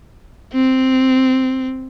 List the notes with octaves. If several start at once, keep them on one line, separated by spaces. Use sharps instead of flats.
C4